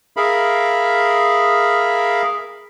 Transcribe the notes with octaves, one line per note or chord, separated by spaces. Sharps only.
G#4 A#4 E5 F5 B5